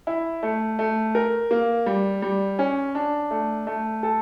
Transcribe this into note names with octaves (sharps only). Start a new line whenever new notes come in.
E4
A3
A3
A#4
A#3
G3
G3
C#4
D4
A3
A3
A4